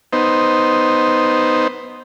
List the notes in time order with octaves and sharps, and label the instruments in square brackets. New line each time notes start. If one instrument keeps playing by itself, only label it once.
[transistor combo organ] B3 D#4 C5